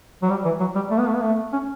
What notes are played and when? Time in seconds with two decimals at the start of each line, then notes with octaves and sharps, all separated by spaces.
0.23 F#3
0.30 G3
0.45 E3
0.60 F#3
0.75 G3
0.91 A3
0.99 B3
1.08 A3
1.15 B3
1.23 A3
1.53 C#4